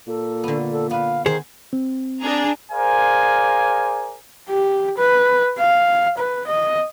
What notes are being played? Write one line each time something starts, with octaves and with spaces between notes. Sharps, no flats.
A#2 A4
D3 B3
A4
B3 B4 F5
D#3 G#4 C5
C4
D4 G#4 A#5
G#4 A#4 C5 D5 F5 G#5
G4
B4
F5
B4
D#5